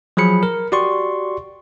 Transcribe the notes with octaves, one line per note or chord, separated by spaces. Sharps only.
F3 F#3 G#4 B5 C#7
A#4
F#4 G4 D5 C6 C#6